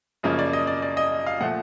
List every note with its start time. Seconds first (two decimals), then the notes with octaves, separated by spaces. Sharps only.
0.23 F#2 C#3 F3 A#3 C#4 D#5
0.39 D5
0.53 D#5
0.67 D5
0.82 D5
0.97 D#5
1.26 F5
1.41 A#2 F3 A3 F#5